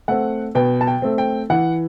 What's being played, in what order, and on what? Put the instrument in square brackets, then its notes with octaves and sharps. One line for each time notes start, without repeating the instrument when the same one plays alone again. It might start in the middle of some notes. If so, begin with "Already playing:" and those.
[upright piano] A3 C4 F#5
B2 G5
A5
G5
A3 C4
G5
E3 F#5